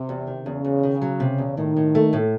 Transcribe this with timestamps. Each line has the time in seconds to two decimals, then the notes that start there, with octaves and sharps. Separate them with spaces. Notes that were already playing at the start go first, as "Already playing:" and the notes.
Already playing: C3
0.09 E2
0.27 D#3
0.46 E2 C#3
0.65 E2
0.83 D#3
1.02 F#3
1.20 C3
1.38 E2
1.57 A2 D#3
1.77 A2
1.95 A3
2.13 A2